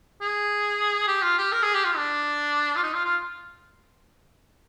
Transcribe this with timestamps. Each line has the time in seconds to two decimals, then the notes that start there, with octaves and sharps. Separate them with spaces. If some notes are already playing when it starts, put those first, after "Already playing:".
0.21 G#4
1.08 G4
1.22 F4
1.38 G4
1.52 A#4
1.63 G#4
1.74 G4
1.85 F4
1.96 D4
2.76 F4
2.83 D#4
2.94 F4
3.04 F4